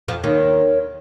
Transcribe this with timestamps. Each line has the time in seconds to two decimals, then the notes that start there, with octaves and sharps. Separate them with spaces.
0.08 F2 F3
0.23 D#2 D#3 A#4 C#5